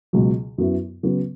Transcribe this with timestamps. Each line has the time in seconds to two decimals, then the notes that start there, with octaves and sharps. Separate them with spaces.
0.13 C#2 B2 F#3
0.58 F#2 F#3 B3 E4
1.03 C#3 F#3 B3